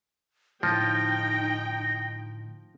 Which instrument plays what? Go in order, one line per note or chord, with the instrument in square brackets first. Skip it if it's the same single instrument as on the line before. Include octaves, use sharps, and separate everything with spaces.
[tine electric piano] A2 D3 [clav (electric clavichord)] F3 [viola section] D#4 G5 [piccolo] A#6